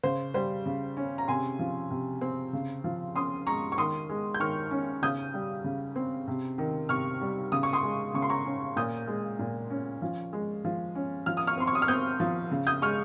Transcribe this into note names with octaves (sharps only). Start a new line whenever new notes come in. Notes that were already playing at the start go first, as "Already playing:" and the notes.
C#3 C5
G3 C5
C#3
C#4
A#5
C3 G#5 C6
F3
C3
C4
C#3
F3
C#4 C6 D#6
G#3 A#5 C#6
C#6
D#3 C6 D#6
G#3
G6
D#3 C#6 F6
C#4
C#3 D#6 G6
G3
C#3
C4
C3
D#3
C3 C#6 F6
G3
C#3 D#6
C#6
C6 D#6
G#3
C#3 C#6
C6
A#5 C#6
C#4
A#2 D#6 G6
G#3
A#2
C#4
F3
G#3
F3
C#4
F3 F6
D#6
C#6 F6
C4 C6
C#6
D#6
F6
C4 D#6 G6
F3
C#3
D#6 G6
G#3 C#6 F6